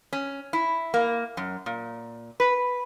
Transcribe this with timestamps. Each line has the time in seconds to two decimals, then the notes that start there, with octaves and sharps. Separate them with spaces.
0.13 C#4
0.53 E4
0.94 A#3
1.37 F#2
1.66 A#2
2.40 B4